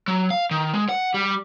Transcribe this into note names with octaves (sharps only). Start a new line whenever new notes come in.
F#3
F5
D#3
G#3
F#5
G3